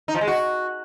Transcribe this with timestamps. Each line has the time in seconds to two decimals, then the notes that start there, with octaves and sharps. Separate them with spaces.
0.08 D#4
0.15 F3
0.21 G#3
0.27 F#4